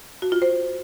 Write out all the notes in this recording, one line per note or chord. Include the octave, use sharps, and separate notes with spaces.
F#4
F4
C5